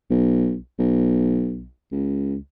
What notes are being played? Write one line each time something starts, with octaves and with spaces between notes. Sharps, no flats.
B1
B1
C#2